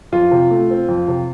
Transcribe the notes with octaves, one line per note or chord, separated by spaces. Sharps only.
F2 F4
C3
A3
C4
F2
C3